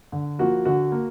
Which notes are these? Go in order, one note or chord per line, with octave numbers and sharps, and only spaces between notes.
D3
F3 A#3 F#4
D3 F#4
A#3